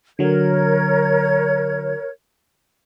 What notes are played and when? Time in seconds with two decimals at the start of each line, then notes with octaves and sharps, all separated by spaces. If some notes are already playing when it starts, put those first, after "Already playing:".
0.19 D3 F#3 A#4 C#5 G#6